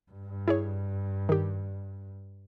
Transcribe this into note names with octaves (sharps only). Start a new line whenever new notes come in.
G2
E4 G#4 C#5
D#3 G4